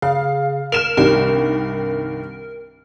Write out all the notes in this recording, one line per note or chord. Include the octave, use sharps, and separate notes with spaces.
C#3 F5
A#4 F6 E7 F7
C2 G2 D#3 A#4